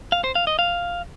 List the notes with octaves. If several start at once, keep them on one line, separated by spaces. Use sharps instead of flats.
F5
C5
F5
D#5
F5